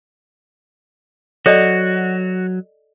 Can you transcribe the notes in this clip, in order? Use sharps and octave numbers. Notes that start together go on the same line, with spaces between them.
F#3 F#4 A4 D5 D#5